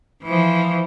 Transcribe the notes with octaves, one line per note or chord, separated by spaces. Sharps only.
E3 F3